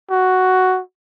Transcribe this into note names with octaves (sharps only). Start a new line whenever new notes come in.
F#4